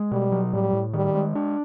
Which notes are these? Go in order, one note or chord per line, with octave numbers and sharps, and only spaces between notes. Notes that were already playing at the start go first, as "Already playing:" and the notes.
Already playing: G#3
B2 G3
F#3
A2 G3
A2
D#3 G3
G#3
D4